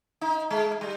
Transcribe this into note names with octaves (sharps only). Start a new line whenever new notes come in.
D#4
G#3
G3